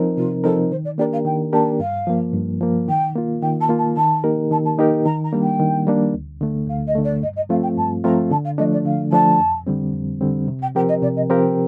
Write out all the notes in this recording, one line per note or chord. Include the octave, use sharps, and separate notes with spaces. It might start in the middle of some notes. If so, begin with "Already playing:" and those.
Already playing: F3 C4 D#4 A#4
C3 F4
F3 C4 D#4 A4 A#4
D#3 C5
D5
A#3 D4 G4 A#4 D5
F5
D#3 G5
A#3 D4 G4 A#4 A5
G2 F5
F3 A#3
G2
F3 A#3
D#3 G5
A#3 F4
D#3 G5
A5
A#3 F4
A5
D#3 A5
A#3 D#4 G4 A#4
D#3 A5
A5
A#3 D#4 G4 A#4
D#3 A#5
A#5
G3 A#3 D4
G5
D#3
G3 A#3 D4
D2
D3 A3
D2 F5
D#5
D3 A3
D5
G2 D#5
D#5
F3 A3 C4 F4 F5
G5
G2 A5
F3 A3 C4 F4 A#5
D3 A5
F5
F3 A3 D4 D#5
D5
D3 F5
F3 A3 D4 A5
F2
D3 G3 C4
F2
D3 G3 C4
C3
G5
F3 C4 G4 A#4 G5
D#5
C3 D5
D#5
F3 C4 G4 A#4 F5